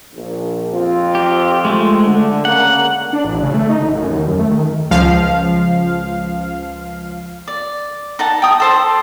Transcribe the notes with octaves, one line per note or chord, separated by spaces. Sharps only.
A#1
F2 C4 F4
G4
G#3 A3
D3
C#3 A#3 F#5
D4
A1
C#3
A3
D#4
A1
F#2
D#2
F#2
A3
D#3
C#2 F3 F5
D5
D#4 F#5 A5
G5 D#6
A4 C5 A5